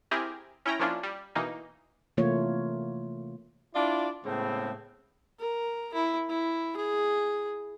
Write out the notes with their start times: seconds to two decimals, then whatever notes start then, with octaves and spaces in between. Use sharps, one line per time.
0.11 C4 E4 G4 G#4 A#4
0.66 C#4 E4 G5 A#5
0.79 F3 A#3 C#4 D4 E4 F4
1.03 G3
1.35 B2 E3 A#3 D#4
2.17 C3 E3 A3 A#3 F4 C#5
3.75 D4 E4 F4 D5
4.25 A2 C#3 G#3 B3 C4
5.39 A#4
5.94 E4
6.29 E4
6.77 G#4